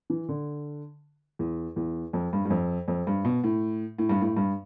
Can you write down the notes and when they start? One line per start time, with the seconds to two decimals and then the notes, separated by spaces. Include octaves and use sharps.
0.10 E3
0.29 D3
1.39 E2
1.76 E2
2.13 F2
2.33 G2
2.45 G2
2.50 F2
2.88 F2
3.07 G2
3.25 B2
3.44 A2
3.98 A2
4.09 G2
4.21 A2
4.37 G2